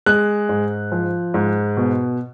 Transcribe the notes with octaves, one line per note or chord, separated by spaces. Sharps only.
G#3 F#6
G#2
F3
G#2
B2